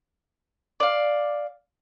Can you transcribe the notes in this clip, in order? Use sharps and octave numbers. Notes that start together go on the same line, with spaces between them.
D5 F5